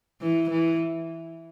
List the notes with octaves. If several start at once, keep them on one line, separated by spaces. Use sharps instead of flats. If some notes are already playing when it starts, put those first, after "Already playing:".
E3
E3